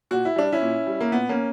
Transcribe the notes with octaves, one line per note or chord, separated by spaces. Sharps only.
A#2 F#4
E4
G3 D4
C#4 E4
A#2
G3
A#3
A#2 B3
A#3 C#4